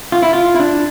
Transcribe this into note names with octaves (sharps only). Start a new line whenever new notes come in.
F4
E4
F4
E4
D4